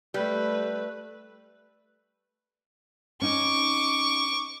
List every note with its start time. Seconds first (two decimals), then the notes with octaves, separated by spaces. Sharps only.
0.14 G3 A3 B4
3.22 C#4 D#4 C#6 D6